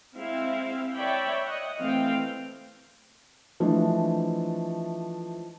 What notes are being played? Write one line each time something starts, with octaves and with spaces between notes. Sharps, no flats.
G#3 C4 E4 E5 F5
C#5 D5 E5 G5 B5
D#5 F#5
E3 A3 C4 F5 G5
E3 F3 G#3 A3 D4